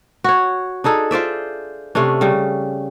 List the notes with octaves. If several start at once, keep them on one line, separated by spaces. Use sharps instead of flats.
F#4 C#5
D4 D#4 G#4 A4
F4 C5 D5 E5
C3 A3 C#4 D4
C#3 G3